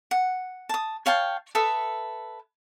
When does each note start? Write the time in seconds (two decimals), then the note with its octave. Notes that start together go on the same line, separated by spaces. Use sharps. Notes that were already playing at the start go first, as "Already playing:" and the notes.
0.11 F#5
0.69 A5 D#6
1.06 C#5 F5 G5 A5
1.55 A4 B4 E5 D#6